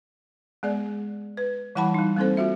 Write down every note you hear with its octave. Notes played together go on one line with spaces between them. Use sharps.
G#3 B3 G#4 D5
B4
E3 G3 E4 F#5 A5 B5
G3 D#4
G3 A#3 C4 D#4 A4 C5
F4 F#4 E5